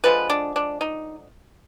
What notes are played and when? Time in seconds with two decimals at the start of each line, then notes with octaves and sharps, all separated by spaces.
0.04 D3 F3 G#3 B4
0.30 D4
0.56 D4
0.81 D#4